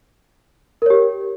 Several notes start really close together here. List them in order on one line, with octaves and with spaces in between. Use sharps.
A#4 C#5 G4